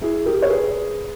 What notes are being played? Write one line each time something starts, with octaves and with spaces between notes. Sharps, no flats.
E4 G#4
G4 A#4
C#5
G#4 B4